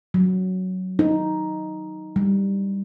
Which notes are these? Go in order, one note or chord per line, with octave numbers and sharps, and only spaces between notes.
F#3
D#4
G3